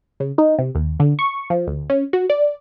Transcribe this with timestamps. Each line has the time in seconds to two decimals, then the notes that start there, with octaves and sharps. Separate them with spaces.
0.20 C#3
0.38 D#4
0.59 C3
0.75 D#2
1.00 D3
1.19 C#6
1.50 F3
1.67 D2
1.90 C#4
2.13 F#4
2.30 D5